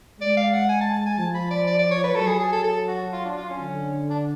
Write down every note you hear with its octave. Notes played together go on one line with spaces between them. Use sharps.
G#3 D5
F5
F#5
G#5
A5
A5
G#5
F3 A5
B5
D5
D5
D5
C#5
B4
F#3 A4
G#4
G#4
A4
A4
F#4
F4
D4
F4
C#4
D3
D4